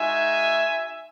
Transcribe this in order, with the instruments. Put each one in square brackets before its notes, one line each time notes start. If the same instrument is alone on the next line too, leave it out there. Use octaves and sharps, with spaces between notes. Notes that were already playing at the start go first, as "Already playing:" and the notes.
Already playing: [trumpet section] G#3 D#4 F#4 E5 G#5